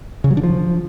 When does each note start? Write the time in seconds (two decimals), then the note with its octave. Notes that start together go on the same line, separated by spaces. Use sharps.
0.24 C#3
0.31 F#3
0.37 D3
0.43 F3